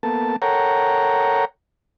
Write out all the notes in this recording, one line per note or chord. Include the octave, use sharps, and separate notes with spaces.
A#3 B3 A4 A5
A4 A#4 C#5 F#5 G5 A#5